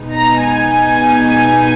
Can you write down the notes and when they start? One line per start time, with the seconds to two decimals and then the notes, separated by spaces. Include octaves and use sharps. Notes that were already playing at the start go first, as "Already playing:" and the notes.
Already playing: B2 G#3 B3 D#4
0.12 A#5
0.41 G#5